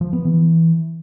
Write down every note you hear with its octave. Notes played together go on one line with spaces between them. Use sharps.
F3
B3
E3